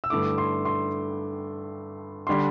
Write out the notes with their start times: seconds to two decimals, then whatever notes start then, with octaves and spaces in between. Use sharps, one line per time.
0.04 E6
0.10 G2 D3 A3 E4 D6
0.38 C6
0.65 C6
2.27 D3 G3 D4 C6